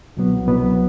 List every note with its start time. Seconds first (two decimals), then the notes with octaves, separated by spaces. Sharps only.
0.17 C2 B2 F#3 B3
0.48 C2 B2 F#3 B3